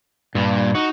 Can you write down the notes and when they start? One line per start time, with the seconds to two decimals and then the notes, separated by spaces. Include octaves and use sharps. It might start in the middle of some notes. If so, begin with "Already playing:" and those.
0.35 G2 A#2
0.75 D#4 F#4